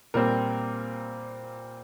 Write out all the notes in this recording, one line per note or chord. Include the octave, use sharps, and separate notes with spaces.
A#2 G3 C4 A#4